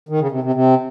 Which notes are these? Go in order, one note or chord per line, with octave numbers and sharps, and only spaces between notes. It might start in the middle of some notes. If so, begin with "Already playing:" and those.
D#3
C#3
C3
C3
C3